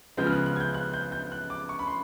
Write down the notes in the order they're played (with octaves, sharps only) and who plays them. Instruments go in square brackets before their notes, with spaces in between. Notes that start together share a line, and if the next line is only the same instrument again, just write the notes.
[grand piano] C#3 F3 G#3 B3 G6
F6
F#6
F#6
G#6
G6
F#6
G6
G6
F#6
D6
C#6
B5
C6